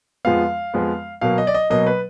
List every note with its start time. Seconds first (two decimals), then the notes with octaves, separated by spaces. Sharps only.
0.25 F2 F3 G#3 B3 F5
0.74 F2 F3 G#3 B3
1.21 B2 F#3 A#3 F5
1.38 D#5
1.47 D5
1.54 D#5
1.70 B2 F#3 A#3 D#5
1.87 B4